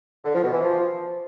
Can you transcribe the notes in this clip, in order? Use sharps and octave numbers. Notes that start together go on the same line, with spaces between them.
D3
F3
B2
E3
F3